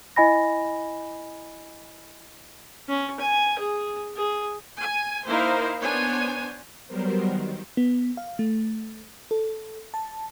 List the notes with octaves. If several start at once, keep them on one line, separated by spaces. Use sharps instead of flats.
E4 D#5 G#5 B5 A#6
C#4
G#5
G#4
G#4
G#5
A#3 D#4 E4 A#4 C5 F5
B3 D4 C5 C#5 G#5
F#3 G3 B3 A#4 C5
D#3
B3
F5
A3
A4
A5